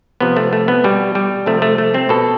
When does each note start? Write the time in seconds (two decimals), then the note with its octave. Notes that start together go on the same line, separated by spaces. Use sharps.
0.21 C3 F3 B3
0.37 A3
0.53 A3
0.68 B3
0.84 B2 G3
1.15 G3
1.46 C3 F3 A3
1.62 A3
1.78 A3
1.94 C4
2.09 B2 A4